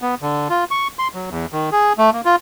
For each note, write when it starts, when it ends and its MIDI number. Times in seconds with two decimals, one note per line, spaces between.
0.02 0.15 59
0.22 0.48 50
0.50 0.64 65
0.71 0.88 85
0.99 1.08 84
1.14 1.29 54
1.30 1.46 40
1.53 1.70 51
1.72 1.93 68
1.98 2.10 57
2.13 2.21 58
2.25 2.36 65